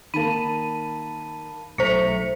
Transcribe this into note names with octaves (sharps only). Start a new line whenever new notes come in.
D#3 A#3 A5 B5 D#7
B1 A3 C5 C#6 A#6 C#7